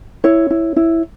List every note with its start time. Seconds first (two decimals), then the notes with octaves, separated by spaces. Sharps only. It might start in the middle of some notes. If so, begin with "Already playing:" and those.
0.24 E4 C#5
0.51 E4
0.76 E4